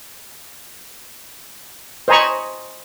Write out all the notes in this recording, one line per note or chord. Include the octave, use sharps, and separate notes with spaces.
C5 D#5 G#5 A#5 B5 C#6